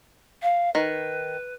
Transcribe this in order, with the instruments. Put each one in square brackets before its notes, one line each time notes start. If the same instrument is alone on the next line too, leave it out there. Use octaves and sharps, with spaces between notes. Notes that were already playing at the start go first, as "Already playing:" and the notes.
[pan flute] F5
[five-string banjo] D#3 [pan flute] B4